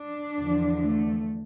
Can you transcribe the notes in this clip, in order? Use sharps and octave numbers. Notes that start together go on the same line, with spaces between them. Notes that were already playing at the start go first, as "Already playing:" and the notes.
Already playing: D4
E2 D3 F3
A3